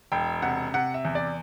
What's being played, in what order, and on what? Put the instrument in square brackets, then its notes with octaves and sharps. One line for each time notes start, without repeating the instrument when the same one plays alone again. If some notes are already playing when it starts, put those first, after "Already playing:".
[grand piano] E1 G5
C3 F#5
C3 F#5
E5
E2
D5